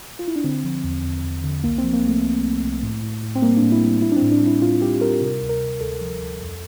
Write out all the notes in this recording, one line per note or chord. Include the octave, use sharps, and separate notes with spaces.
F4
E4
D4
D3 C4
F3
E2
E2
E2
D3
C2 A#3
C4
F3
A#3
C2 A3
C2
C2
C2
A2
A2
A2
C4
G3 A#3
D4
A2
E4
G3
G3 E4
D4
C4
A2
D4
G3
E4
A2 F4
G3 G4
G3 A#4
C3 A#4
D2
A#4
C3
D2 A4
F3
D2
F2